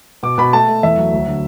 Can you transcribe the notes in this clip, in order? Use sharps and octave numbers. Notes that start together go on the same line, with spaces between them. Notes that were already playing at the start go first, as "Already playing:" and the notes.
B2 D6
B2 B5
A3 A5
A3
E2 E5
F#3
D2
D3